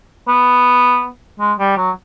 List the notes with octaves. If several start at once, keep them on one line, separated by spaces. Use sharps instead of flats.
B3
G#3
G3
F#3